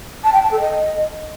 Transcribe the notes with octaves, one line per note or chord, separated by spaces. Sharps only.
A5
G5
A5
A4
D#5